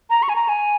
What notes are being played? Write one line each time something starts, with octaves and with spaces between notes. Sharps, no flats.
A#5
C#6
G#5
A#5
G#5